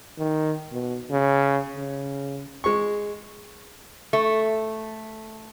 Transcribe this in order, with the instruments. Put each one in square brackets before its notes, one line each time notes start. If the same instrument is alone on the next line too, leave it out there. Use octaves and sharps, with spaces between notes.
[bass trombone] D#3
B2
C#3
C#3
[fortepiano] G#3 C#6
[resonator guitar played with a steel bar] A3